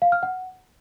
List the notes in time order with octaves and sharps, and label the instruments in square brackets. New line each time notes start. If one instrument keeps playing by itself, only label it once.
[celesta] F5
F6
F#5